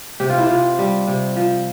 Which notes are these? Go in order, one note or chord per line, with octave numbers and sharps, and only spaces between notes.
C3 G4
F4
E4
C3 F4
G3
C3
F3